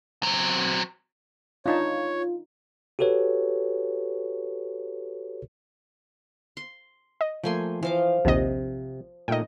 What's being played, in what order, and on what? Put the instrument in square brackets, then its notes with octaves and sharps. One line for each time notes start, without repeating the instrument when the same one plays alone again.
[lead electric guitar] F#3 C4
[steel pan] D4 D#4 A5 [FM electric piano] F4 [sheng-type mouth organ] C#5
[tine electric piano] F#4 G4 A4 B4 C#5
[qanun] C6
[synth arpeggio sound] D#5
[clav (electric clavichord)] F3 A3 A#3 [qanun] G5 G#5 C6
[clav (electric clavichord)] E3 [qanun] F3 F5 D6
[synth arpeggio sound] A#1 D#2 D#5 [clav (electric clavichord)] C3
[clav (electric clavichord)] A#2 A3 D#4 [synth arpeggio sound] D#5 G5